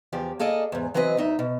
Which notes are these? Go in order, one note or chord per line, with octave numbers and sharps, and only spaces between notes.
E2 F3 G4
A#3 G#4 A4 D5 D#5
E2 G#2
E3 F#3 C4 B4 D#5
D2 D#4 E5
B2